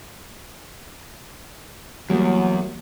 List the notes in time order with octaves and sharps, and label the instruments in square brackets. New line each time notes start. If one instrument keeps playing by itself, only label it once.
[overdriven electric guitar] E2 [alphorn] F#3 [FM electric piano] G3 A3 A#3